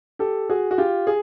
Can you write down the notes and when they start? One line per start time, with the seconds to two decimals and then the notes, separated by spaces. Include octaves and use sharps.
0.19 G4 A4
0.50 F#4 G#4
0.71 F#4
0.78 F4 G4
1.07 G#4